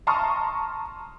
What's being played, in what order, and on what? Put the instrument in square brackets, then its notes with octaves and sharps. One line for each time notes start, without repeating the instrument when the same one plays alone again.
[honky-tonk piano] A5 A#5 C6 C#6 D#6 F6